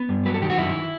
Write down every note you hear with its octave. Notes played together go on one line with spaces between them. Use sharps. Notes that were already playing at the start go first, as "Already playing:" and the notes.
Already playing: B3
G2
F#3 B4
A4
D#3 G4
F#4
F#2 E4